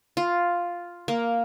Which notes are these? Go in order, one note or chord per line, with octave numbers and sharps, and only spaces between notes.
F4
A#3